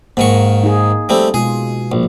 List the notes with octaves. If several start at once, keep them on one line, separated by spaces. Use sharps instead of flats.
G#2 D#3 A#3 C#6
D#4 G#4
G3 A3 C4
B2 G#3 F4 G#4
A#1